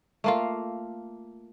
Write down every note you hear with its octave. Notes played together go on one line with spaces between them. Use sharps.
A3 A#3 F4